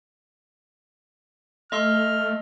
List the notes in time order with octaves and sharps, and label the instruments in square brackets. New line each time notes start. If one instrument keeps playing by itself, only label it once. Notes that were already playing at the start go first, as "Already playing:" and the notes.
[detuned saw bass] A3 [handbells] D#5 C6 E6 [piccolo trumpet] F6